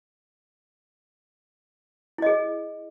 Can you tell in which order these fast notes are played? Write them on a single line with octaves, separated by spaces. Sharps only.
E4 D#5 G#4